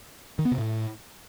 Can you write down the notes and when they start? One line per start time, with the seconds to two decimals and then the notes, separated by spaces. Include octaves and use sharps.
0.39 D#3
0.45 B3
0.52 C3
0.58 A2